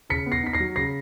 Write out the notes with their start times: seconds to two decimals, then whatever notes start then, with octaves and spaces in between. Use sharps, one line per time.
0.09 C#3 B6 C#7
0.26 B3
0.32 A#6 C7
0.43 D#4 B6
0.53 A#6 C7
0.60 F#3
0.76 C#3 A#6 C7